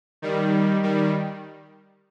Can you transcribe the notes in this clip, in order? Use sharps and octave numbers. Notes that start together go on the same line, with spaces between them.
D#3 G3
D#3 G3